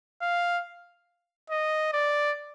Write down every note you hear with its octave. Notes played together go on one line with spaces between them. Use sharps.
F5
D#5
D5